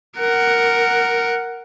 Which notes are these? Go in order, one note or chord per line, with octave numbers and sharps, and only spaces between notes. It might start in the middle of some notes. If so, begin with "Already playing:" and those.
A#4 F#5